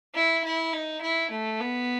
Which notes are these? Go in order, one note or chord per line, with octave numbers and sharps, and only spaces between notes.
E4
E4
D#4
E4
A3
B3